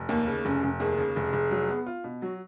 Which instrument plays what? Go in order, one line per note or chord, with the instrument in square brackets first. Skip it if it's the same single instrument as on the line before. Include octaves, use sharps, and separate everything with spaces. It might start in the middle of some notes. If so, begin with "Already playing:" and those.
Already playing: [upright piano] F1
[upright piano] D#2 [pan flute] A#3
[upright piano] C#3
[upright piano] F1 [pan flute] C#4
[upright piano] F1
[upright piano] D#2 [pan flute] G#4
[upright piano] C#3
F1
F1
F#3
B3
F4
B2
[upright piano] F#3 [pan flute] F#4